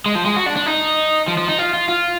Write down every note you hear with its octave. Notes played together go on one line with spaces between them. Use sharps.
G#3
F3
G#3
F#4
D4
D4
D#4
F3
F3
D#4
F4
F4
F4